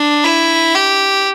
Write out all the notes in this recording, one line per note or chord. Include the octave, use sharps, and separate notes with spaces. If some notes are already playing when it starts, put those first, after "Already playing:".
Already playing: D4
E4
G4